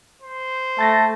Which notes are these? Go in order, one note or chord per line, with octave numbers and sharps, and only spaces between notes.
C5
A3 A5 A6 A#6